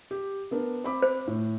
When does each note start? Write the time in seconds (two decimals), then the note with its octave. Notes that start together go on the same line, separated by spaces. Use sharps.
0.11 G4
0.51 B3 D4 A#4
0.84 C4 B5 D6
1.02 C5
1.27 A2